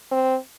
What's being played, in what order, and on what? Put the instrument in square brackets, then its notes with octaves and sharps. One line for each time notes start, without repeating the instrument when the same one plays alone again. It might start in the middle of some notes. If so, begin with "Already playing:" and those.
[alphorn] C4